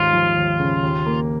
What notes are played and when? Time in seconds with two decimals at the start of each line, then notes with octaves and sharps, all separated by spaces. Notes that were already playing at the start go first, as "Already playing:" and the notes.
Already playing: D#2 G#2 F4
0.13 F3
0.36 D#2
0.60 C#3
0.82 D#2
1.06 A#3